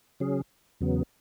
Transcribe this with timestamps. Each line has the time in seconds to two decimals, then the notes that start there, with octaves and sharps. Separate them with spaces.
0.20 C#3 F#3 C#4 G#4
0.81 E2 C#3 F#3 B3